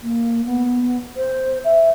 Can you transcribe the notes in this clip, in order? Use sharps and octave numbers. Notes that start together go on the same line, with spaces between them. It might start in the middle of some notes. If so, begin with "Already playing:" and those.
A#3
B3
C5
E5